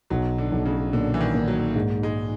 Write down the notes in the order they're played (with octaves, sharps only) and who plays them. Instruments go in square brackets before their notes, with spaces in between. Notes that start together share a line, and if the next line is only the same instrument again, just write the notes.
[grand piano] B1 [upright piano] F#3
[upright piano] D3
[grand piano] B1
[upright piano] C#3
[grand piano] A#2 [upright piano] D3
[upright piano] E3
D#3
[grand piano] A#2
[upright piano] F#3
[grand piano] G#2
[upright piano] G#3